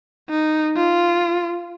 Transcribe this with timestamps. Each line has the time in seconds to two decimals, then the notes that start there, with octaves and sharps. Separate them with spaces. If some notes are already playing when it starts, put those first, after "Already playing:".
0.30 D#4
0.76 F4